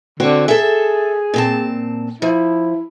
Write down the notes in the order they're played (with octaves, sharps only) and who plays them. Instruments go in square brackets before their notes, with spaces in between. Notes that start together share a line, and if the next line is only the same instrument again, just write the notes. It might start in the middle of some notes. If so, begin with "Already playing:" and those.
[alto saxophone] D3 [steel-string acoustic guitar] C4 F#4 C#5
[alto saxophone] G#4 [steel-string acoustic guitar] A4 E5
[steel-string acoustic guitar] A#2 C4 A5
[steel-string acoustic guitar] F3 [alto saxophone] E4